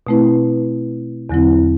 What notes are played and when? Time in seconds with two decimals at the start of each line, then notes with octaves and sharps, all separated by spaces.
0.07 B2 A3 C4 E4 B4
1.30 E2 D3 F#3 C4 E4